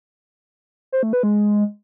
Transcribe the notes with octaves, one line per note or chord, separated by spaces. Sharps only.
C5
A3
B4
G#3